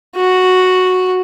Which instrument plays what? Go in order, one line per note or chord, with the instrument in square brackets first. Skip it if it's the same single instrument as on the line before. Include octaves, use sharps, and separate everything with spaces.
[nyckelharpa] F#4